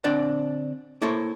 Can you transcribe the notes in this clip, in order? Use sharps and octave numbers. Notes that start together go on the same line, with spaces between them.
D3 C4 D4 D5 F#5
A#3 E4 A4 C5 C#5